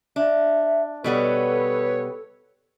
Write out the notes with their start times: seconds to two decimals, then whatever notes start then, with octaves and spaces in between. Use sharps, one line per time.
0.16 D4 E5
1.04 B2 G3 B3 A4 B4 C#5